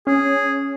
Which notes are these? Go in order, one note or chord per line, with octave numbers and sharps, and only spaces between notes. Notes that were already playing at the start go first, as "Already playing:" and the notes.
C#4 G#4